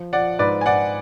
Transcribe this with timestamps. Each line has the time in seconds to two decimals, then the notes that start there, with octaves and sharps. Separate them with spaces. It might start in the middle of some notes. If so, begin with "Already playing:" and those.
Already playing: F3
0.13 F3 D5 F#5
0.39 G#2 B4 D5
0.61 G#5
0.66 G#2 D5 F#5